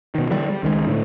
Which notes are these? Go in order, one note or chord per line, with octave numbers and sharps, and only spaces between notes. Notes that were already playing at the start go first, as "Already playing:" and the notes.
B2 D#3
D3 E3 F3 G3
G3
C#2 D#3 F3 G#3
A2 D3 A3